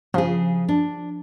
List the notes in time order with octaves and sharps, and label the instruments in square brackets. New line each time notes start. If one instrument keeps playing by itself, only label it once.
[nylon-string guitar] C#3 G#4 [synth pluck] F3
[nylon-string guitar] D4